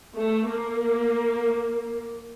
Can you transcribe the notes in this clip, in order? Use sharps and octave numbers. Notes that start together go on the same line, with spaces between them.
A3
A#3